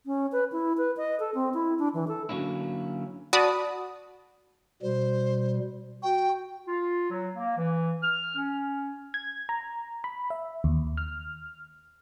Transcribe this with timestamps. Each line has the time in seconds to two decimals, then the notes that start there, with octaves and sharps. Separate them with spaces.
0.06 C#4
0.32 B4
0.52 E4
0.77 B4
0.97 D#5
1.20 A4
1.35 C4
1.54 E4
1.79 D4
1.94 E3
2.08 A4
2.29 D3 F#3 A#3 C#4 E4
3.33 F#4 D5 A5 B5 D#6
4.83 B2 G3 C5
6.03 F#4 G5
6.67 F4
7.10 F#3
7.34 A#3
7.57 E3
8.02 F6
8.36 C#4
9.14 G#6
9.49 A#5
10.04 B5
10.30 E5
10.64 D#2
10.97 F6